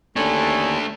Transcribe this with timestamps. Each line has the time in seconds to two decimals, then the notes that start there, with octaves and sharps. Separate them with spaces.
0.16 D#2 D3 A3 C#4 D4 A5